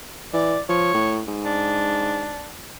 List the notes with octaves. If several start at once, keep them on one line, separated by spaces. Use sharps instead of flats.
E3 D5
F3 C#5
A2
G#2
D4